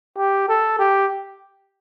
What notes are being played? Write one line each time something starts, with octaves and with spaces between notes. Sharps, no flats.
G4
A4
G4